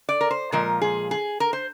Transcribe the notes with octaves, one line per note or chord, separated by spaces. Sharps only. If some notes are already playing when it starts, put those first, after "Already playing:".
D5
A#4
C5
A#2 F3 G#3 A#4
G#4
G#4
A#4
C5